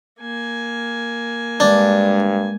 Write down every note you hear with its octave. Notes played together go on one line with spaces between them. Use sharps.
A#3 G#5
G2 G#3 D4